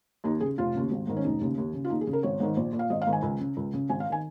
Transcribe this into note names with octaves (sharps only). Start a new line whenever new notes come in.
D#2 D#4
C#3 G#4
F1 F4
D#2 C#3
G#1
G#2 D#3
C#4
F1 D#4
D#2 C#3
D#2
C#3
F4
D#2 D#4
G#4
C#3
A#4
G#1 C#5
G#2 D#3
A#1
A#2
F5
G#1 D#5
F5
G#2 D#3
G#5
C#2
C#3
C#2
C#3
G#1 G#5
F5
D#3 G#5